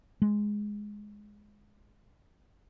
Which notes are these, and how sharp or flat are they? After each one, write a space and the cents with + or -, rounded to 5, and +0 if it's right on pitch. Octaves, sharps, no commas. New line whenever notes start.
G#3 +0